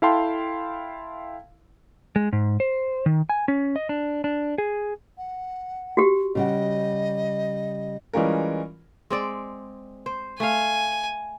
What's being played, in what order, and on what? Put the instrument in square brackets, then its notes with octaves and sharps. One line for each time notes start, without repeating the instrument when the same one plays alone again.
[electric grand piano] E4 A4 F5 G5 A5 C6
[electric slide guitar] G#3
G#2
C5
D#3
G#5
C#4
D#5
D4
D4
G#4
[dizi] F#5
[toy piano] F#4 G4
[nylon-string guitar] C#3 G3 F#5 [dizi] D#5
[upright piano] E3 G3 G#3 C#4 F4 A#4
[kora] G#3 C4 D5
C5
[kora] A3 F5 [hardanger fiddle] G#5